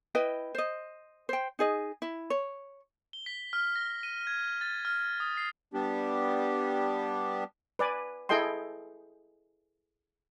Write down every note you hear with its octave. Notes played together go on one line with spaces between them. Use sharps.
E4 B4 D#5 G5
C5 D#5
C5 G5
D#4 G#4 D#5
E4
C#5
G7
B6
F6
A#6
D#7
G#6
A6
F6
D#6
C7
G3 B3 D4 G4
B4 D5 G#5
E4 G#4 A4 D#5 G5 C6